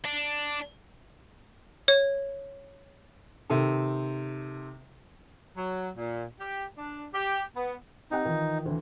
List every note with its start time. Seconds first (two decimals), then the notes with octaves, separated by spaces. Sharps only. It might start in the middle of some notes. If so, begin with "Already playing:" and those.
0.05 D4
1.88 C#5
3.50 C3 D#3 A4
5.57 F#3
5.96 A#2
6.39 G4
6.77 D4
7.14 G4
7.55 B3
8.11 C4 D#4 G4 F#5
8.25 D#3 E3 F4
8.65 D2 E3